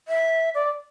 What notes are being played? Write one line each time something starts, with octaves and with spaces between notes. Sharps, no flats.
E5
D5